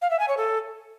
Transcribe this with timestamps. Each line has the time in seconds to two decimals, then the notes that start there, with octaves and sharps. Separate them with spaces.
0.02 F5
0.11 E5
0.19 G#5
0.28 C#5
0.37 A4